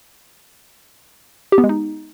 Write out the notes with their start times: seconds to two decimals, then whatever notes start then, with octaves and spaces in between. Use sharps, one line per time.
1.52 G4
1.58 B3
1.64 G#3
1.69 D#4